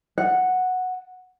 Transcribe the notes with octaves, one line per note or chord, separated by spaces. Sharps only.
F#5